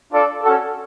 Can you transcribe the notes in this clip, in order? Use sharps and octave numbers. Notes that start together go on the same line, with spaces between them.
D4 F4 A4 D5
C#4 F#4 A4